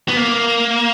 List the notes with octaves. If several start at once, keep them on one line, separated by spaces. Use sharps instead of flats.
B3
A#3